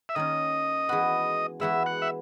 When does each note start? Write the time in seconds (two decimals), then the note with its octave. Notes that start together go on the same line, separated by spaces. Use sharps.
0.09 E5
0.15 D#3 A#3 C#4 D#5
0.89 E3 G#3 B3 F#4
1.60 E3 G#3 B3 F#4 E5
1.86 F#5
2.02 E5